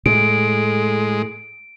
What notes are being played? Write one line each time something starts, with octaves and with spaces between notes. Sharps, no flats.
A2 G#3 D7